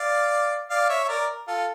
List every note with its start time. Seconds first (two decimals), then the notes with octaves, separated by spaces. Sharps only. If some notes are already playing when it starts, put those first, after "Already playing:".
Already playing: D5 F5
0.70 D5 F5
0.89 C#5 E5
1.04 E5
1.08 A#4 D5
1.47 F4 A4